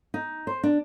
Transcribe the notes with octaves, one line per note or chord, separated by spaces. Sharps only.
D#4
C5
D4